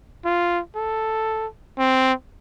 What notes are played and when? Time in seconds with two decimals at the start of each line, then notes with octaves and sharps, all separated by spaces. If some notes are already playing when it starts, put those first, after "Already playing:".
0.25 F4
0.75 A4
1.77 C4